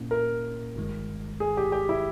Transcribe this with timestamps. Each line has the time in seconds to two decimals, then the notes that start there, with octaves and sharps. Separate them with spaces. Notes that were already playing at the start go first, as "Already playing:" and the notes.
Already playing: A#2 A#3 C#4 E4
0.11 A#4
0.76 G1 G2 D#3 G#3
1.40 G#4
1.57 G4
1.72 G4
1.89 E4